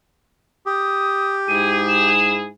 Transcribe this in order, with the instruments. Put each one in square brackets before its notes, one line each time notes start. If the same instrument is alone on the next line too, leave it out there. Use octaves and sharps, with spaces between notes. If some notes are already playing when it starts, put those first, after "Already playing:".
[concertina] G4 [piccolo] D#6
[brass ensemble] G#2 E4 G#4 [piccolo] D#7
[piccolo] E7